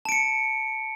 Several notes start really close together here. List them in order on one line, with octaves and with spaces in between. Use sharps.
A5 D7 C#7